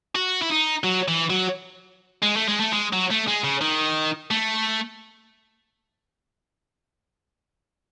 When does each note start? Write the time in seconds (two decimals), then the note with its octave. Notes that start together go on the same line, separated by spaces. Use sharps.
0.15 F#4
0.42 E4
0.50 D#4
0.84 F#3
1.08 E3
1.30 F#3
2.22 G#3
2.36 A3
2.48 G#3
2.60 A3
2.73 G#3
2.93 F#3
3.10 A3
3.27 G#3
3.44 C#3
3.61 D#3
4.31 A3